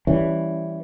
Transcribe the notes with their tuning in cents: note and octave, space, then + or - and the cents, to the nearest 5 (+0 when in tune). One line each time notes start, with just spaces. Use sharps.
E3 +0 G3 +0 C#4 +5